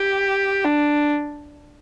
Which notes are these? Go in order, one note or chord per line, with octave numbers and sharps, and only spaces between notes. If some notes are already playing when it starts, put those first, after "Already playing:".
Already playing: G4
D4